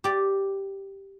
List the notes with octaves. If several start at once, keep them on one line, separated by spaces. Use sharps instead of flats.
G4 D5